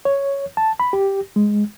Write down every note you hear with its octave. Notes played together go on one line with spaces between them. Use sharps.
C#5
A5
B5
G4
G#3